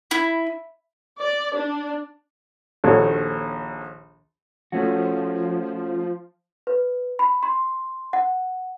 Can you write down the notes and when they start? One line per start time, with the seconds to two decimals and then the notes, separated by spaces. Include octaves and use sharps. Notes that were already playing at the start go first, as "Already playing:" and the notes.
0.11 E4
1.20 D5
1.55 D4
2.84 A#1 D#2 D4 F#4 A4 C#5
4.72 F3 A3 C#4 F#4
6.67 B4
7.19 B5
7.43 C6
8.13 F#5